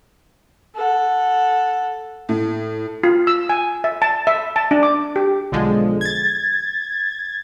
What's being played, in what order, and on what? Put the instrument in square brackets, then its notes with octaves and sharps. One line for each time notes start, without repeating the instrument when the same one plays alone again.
[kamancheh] A4 F#5
[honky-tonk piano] A2
[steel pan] F4
E6
G#5
E5
A5
E5
A5
D4
D6
G4
[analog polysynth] B1 D3 F3 G#3
G#6 A6